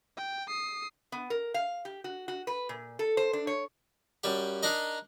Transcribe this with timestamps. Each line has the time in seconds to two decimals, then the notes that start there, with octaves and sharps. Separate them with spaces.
0.17 G5
0.48 D#6 C7
1.12 B3
1.30 A#4
1.54 F5
1.85 G4
2.04 F#4
2.28 F#4
2.47 B4
2.69 A#2
2.99 A4
3.17 C5
3.33 D4
3.47 C#5
4.24 F#2 G3 G4
4.63 D4 D#4 A#4 D#5